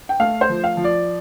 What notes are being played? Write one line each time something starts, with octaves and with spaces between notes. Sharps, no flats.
G5
A3 F5
C5
F3
F5
F3
D5